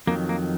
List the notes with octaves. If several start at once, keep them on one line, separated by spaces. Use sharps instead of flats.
F2 D#3 F#3 A#3
A#3